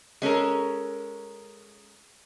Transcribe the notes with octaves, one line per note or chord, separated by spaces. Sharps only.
G#3 C#4 A4 A#4